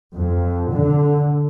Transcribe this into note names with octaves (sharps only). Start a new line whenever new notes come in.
F2
D3